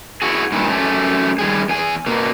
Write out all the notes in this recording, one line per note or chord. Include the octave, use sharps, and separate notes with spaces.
E4 F#4 G#4
G2 A#2 D#3 E4
F#2 A3 G4 G#5
D#3 G3 G#4
E2 G#4 G#5
B2 A#3